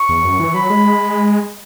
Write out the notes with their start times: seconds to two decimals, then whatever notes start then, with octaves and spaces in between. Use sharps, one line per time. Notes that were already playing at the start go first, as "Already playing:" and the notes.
Already playing: C#6
0.09 E2
0.24 F#2
0.40 E3
0.54 F#3 B5
0.70 G#3